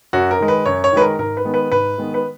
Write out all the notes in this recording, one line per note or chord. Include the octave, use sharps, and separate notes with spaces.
F#2 F#4
A#4
D#3 G#3
B4
F#2 C#5
C#5
D#3 G#3 B4
A#4
G#2 A#4
B4
D#3 G#3 B3
B4
G#2 B4
D#3 G#3 B3
B4